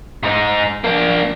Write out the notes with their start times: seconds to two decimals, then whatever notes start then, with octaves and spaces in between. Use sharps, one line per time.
0.24 G#2 D#4
0.84 A#3 D4